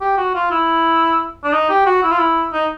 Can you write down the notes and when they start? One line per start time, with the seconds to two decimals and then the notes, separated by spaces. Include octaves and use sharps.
0.01 G4
0.18 F#4
0.35 F4
0.51 E4
1.44 D4
1.53 D#4
1.70 G4
1.86 F#4
2.03 E4
2.11 F4
2.18 E4
2.54 D#4